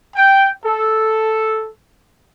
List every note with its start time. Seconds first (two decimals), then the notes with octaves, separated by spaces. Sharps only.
0.16 G5
0.66 A4